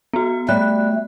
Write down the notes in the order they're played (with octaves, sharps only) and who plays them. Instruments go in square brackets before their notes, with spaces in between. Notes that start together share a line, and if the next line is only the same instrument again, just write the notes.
[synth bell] B3 F#4
[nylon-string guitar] G3 [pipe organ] A3 [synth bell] F#6